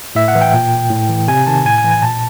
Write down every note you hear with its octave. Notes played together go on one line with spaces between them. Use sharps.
A2 E5
F#5
E3
G5
A#2
A2
E3
C3 G#5
D#3 A5
A2 G#5
G#5
E3
G#5
A#2 A5